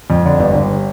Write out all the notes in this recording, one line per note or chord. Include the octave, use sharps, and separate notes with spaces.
F2
D3
G1
G1